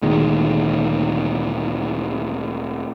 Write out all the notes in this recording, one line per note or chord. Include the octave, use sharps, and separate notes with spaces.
D2 A#2 D#3 G#3